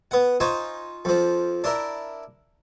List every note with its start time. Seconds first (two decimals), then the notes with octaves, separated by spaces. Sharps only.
0.11 B3 F#5
0.40 D#4 F4 C5 G#5 C#6
1.05 F2 F3
1.64 D4 E4 A#4